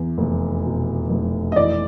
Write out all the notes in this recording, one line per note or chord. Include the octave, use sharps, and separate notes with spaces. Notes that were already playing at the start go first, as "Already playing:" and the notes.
Already playing: E2
F1
B2
F1
D#5
E3 D5